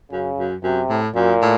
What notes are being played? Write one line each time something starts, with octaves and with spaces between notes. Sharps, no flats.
F#2 C#3
F#2
F#2 C3
A2
F#2 A#2
A2